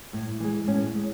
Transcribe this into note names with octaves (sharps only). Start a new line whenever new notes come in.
A2
E3 G#3
A2 C#4
G#3